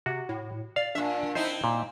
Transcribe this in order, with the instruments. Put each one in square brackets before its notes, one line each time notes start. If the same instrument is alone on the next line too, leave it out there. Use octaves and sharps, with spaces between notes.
[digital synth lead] C3 [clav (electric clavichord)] F#4
[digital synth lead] A2
[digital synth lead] D5 [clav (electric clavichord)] F5
[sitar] A#2 E5 [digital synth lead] D4
[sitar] C4 D#4 E4 [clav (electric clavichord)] C5
[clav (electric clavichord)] A#2